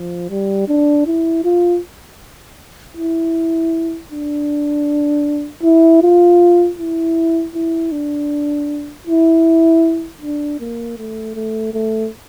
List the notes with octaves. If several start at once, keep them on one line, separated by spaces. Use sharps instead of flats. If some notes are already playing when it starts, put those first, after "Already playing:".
Already playing: F3
G3
D4
E4
F4
E4
D4
E4
F4
E4
E4
D4
E4
D4
A#3
A3
A3
A3